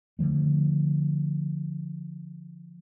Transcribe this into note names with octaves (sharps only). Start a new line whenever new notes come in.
D3 E3 F3 A3